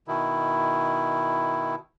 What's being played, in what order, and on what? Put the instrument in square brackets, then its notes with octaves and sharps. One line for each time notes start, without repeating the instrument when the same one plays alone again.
[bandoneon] B2 D#3 E4